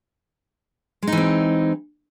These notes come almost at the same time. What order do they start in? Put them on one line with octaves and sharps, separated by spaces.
G#3 D#4 E3 C4